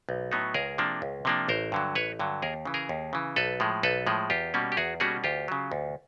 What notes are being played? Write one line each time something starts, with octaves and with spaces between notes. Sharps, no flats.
B1
A2 F#3 B3 D#4
C#2 G#4 A#4
C3 F3 A#3 D4
C#2
C3 F3 A#3 D4
A1 A#4 C5
G2 D3 F#3
A1 B4 C#5
G2 D3 F#3
D#2 G#4 A#4
C#3 E3
G#4 A#4
D#2
C#3 E3
B1 A4 B4
A2 F3 G#3
B1 A4 B4
A2 F3 G#3
E2 F4 G4
B2 G3 A#3 C#4
G4
E2 F#4 G#4
B2 G3 A#3 C#4 F#4 G#4
D2 F4 G4
C#3 F#3
D2